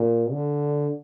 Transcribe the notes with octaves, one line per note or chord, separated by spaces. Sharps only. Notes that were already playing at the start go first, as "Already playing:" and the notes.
Already playing: A#2
D3